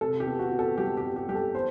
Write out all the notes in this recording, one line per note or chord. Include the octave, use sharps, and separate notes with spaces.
C3 A4
G4
B3
F#4
B3
A4
G3 G4
G4
B3
G4
G3 G4
A4
B3 C5